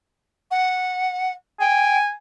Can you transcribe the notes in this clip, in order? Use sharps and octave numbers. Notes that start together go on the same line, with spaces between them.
F#5
G5 G#5